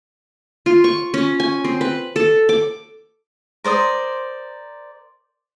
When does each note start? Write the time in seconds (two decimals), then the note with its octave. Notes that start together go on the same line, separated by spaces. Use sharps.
0.66 F4
0.84 C#6
1.14 C#4
1.40 G#5
1.64 C4
1.81 B4
2.16 A4
2.49 D6
3.64 A#4 C5 D5 D#6